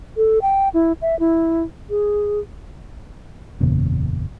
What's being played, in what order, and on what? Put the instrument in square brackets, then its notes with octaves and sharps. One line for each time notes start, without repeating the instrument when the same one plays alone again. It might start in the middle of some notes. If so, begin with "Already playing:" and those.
[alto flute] A4
G5
E4
E5
E4
G#4
[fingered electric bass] F#1 E2 A#2 C#3